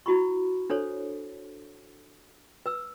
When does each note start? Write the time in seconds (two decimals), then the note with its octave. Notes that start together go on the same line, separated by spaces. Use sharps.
0.06 E4 F#4 B5 C#6
0.70 D4 A4 C5 C#5
2.66 B4 E6